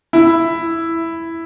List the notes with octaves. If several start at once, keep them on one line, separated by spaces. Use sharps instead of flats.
E4